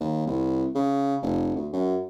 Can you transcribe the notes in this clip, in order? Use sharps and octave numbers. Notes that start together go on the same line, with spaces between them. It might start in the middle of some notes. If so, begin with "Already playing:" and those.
D#2
C2
C#3
F1
D2
F#2